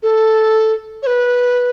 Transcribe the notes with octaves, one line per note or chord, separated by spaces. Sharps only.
A4
C#5
B4